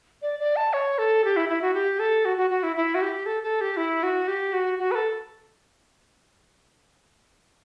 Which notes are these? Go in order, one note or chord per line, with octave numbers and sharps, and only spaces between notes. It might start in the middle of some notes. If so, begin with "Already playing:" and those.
D5
D5
A5
C#5
A4
G4
E4
E4
F#4
G4
A4
F#4
F#4
F#4
E4
E4
F#4
G4
A4
A4
G4
E4
F#4
G4
F#4
F#4
B4
A4